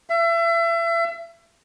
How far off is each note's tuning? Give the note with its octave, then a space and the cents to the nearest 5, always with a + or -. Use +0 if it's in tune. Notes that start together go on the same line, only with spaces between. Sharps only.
E5 +35